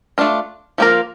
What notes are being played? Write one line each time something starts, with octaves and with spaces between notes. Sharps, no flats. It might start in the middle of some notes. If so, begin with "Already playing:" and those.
A3 D4 F4
F3 A#3 C#4 F4 A#4